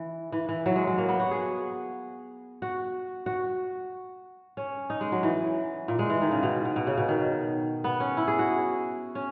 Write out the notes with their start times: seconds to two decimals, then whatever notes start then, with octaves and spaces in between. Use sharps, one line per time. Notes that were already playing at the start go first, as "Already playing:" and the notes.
Already playing: E3
0.32 E3
0.49 E3
0.66 F#3
0.76 G#3
0.87 F#3
0.98 A#3
1.08 B3
1.20 F#4
1.31 G#4
2.62 F#4
3.26 F#4
4.57 C#4
4.90 D#4
5.01 G#3
5.12 F#3
5.23 E3
5.88 A#2
5.99 G#3
6.10 E3
6.22 D#3
6.31 C#3
6.43 B2
6.65 B2
6.76 B2
6.87 C#3
6.98 B2
7.09 D#3
7.84 B3
8.00 C#4
8.17 E4
8.28 G#4
8.39 F#4
9.15 C#4